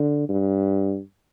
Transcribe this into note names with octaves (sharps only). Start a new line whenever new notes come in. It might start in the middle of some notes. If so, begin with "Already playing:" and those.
Already playing: D3
G2